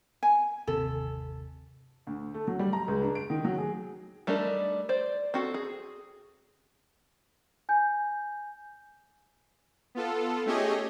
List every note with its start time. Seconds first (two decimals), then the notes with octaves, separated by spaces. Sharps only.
0.23 G#5
0.67 G1 D#2 C3 A4
2.07 D2
2.34 A3
2.47 F#3
2.59 G3
2.73 A#5
2.88 C#2
3.02 D4
3.15 D7
3.30 D#3
3.44 F#3
3.58 G#4
4.27 G3 A3 D4 D#4 A#4
4.89 C5 D5
5.34 C4 F#4 A4
5.54 G#4
7.69 G#5 G6
9.95 B3 F4 A4
10.46 A3 C#4 G4 G#4 C#5 D#5